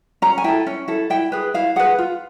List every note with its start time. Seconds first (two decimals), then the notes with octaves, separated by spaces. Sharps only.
0.22 C#4 A#5
0.38 G#5
0.44 E4 A4 G5
0.67 C#4
0.88 E4 A4
1.10 E4 G5
1.32 G#4 B4
1.54 E4 F5
1.76 G#4 B4 F#5
1.99 F4